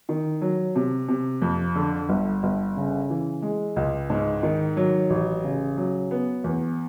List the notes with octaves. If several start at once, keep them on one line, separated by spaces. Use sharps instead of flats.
D#3
F#3
C3
C3
F2
D3
G1
G1
C#3
E3
G#3
C#2
G#2
D#3
F#3
A1
C#3
F#3
B3
E2